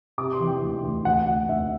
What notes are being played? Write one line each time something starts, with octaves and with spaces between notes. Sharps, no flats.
C3 D6
C6
E3
G5
D2
D2
D2 F#5
D2
D2 E5